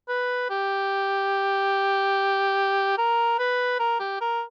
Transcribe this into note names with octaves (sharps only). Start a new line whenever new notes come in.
B4
G4
A#4
B4
A#4
G4
A#4